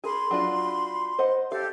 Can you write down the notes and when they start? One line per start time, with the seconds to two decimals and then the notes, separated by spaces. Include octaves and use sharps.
0.04 G#4 A#4 B5 C6
0.31 F#3 D4 F4
1.19 C5 D#5 F#5
1.52 G4 A4 F5